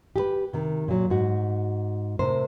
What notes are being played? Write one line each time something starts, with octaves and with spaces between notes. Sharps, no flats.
G4 G#4 B4
C3 D#3
A#2 F#3
G#2 F#4
A2 C3 A#4 C5